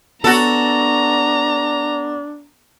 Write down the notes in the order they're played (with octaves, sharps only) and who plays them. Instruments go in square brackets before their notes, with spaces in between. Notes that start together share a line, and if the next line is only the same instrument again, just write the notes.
[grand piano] B3 [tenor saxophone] D4 [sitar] F#4 A4 [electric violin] A#5